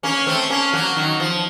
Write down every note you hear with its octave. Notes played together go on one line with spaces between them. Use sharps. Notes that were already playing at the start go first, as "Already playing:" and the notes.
A#3 C#4
A3 C4
A#3 C#4
F#3 A#3
D#3 F#3
F3